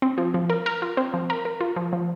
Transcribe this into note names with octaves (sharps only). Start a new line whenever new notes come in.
C4
F3
F3
A#4
A#4
F4
C4
F3
A#4
A#4
F4
F3
F3